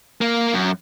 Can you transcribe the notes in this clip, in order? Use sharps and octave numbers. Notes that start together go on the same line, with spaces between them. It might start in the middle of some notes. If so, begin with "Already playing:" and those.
A#3
F#2